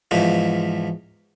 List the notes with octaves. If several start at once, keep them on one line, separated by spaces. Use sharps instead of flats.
E2 G#2 F3